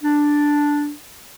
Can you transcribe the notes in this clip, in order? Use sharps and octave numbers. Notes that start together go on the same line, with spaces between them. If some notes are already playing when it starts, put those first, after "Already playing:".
D4